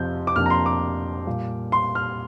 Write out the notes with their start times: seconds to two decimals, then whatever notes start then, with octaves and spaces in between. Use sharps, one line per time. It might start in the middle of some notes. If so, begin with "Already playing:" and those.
Already playing: F2 C3 F3 G6
0.27 D6
0.36 F2 C3 A#3 D4 F6
0.46 A#5
0.50 C6
0.66 D6
1.27 A#2 G3 A#3
1.72 C6
1.95 F6